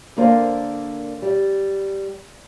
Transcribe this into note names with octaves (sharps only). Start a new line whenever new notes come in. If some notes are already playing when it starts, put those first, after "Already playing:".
D3 A#3 A#4 C5 D5
G3